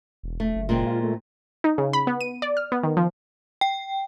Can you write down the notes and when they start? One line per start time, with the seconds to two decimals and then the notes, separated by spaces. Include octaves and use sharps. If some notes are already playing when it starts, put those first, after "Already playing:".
0.23 E1
0.40 A3
0.56 F#1
0.69 A#2 G#3 C4
0.86 F4
1.03 A3
1.64 D#4
1.78 C#3
1.93 B5
2.07 B3
2.21 D#7
2.42 D5
2.57 F6
2.72 B3
2.83 D#3
2.97 F3
3.61 G5